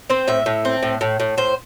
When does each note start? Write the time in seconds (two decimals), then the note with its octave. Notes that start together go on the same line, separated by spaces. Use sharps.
0.10 C4 C5
0.28 A2 E5
0.46 A2
0.65 C4
0.83 A2
1.01 A2
1.20 A2
1.37 A2 C5